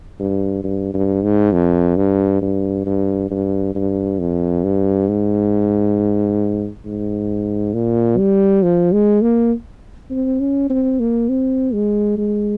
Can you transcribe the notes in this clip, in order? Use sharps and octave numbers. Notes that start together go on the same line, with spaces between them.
G2
G2
G2
G#2
F2
G2
G2
G2
G2
G2
F2
G2
G#2
G#2
A#2
G3
F3
G#3
A#3
C4
C#4
C4
A#3
C4
G#3
G#3